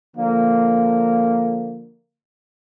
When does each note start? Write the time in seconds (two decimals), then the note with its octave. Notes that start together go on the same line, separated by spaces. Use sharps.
0.16 D3 F3 A#3